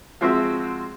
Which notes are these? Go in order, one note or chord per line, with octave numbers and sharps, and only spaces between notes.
F3 G#3 C4 F#4 E5